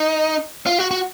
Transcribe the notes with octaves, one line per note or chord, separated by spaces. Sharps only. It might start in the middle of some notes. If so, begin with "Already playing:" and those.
Already playing: D#4
F4
F#4
F#4